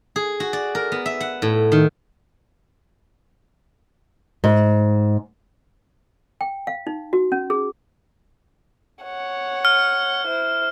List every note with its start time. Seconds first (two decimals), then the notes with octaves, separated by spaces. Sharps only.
0.16 G#4
0.40 F#4
0.53 D5
0.75 A#4
0.92 B3
1.06 E5
1.20 F#5
1.42 A2
1.72 D#3
4.44 G#2
6.41 G5
6.67 F5
6.87 D#4
7.13 F#4
7.32 C#4
7.50 G#4
9.03 C#5 F#5
9.65 F6
10.27 E4 C5